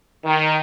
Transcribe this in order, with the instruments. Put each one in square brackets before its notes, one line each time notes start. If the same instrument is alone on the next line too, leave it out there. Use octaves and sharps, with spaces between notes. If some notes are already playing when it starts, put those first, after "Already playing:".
[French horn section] D#3